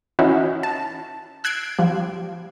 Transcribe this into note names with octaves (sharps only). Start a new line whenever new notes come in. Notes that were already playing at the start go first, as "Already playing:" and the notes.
E3 C#4 D#4 E4 F#4
A5
E6 F#6 G#6 C7 D7
F3 G3